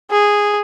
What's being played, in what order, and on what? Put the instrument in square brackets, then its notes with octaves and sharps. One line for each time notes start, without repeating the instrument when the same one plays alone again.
[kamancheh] G#4